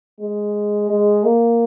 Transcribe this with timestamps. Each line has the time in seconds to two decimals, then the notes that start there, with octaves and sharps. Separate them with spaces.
0.21 G#3
0.89 G#3
1.24 A#3